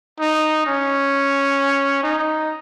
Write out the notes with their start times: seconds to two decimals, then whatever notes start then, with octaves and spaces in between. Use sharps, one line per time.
0.20 D#4
0.66 C#4
2.03 D#4